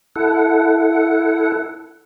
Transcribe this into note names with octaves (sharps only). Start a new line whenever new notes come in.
E4 A4 F#5